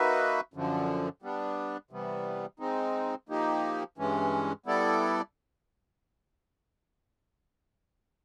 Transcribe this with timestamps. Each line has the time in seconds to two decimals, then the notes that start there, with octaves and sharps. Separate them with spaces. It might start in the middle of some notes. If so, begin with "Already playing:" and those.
Already playing: A#3 D#4 F#4 B4 E5
0.54 F#2 D3 F3
1.22 G3 B3 D4
1.91 C3 E3 G3 B3
2.59 G#3 C4 D#4
3.29 F3 A#3 D#4 G4
3.98 G2 E3 G#3 C#4
4.66 G3 B3 E4 A4 D5